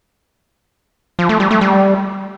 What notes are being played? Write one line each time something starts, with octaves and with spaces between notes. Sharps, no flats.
F3
A3
G3
A3
G3